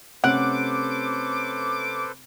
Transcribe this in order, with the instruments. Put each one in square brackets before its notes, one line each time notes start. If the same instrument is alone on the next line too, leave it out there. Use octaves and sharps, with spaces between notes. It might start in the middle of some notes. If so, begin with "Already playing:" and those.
[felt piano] C3 A3 C#4 [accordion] A4 B4 C5 [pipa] F#5 [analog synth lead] D6